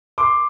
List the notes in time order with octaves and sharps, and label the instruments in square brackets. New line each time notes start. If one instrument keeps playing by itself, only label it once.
[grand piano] C6 D6